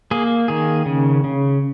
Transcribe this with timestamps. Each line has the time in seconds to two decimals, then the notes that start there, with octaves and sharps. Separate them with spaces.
0.11 A#3 G#4
0.48 D#3 G#4
0.86 C#3
1.24 C#3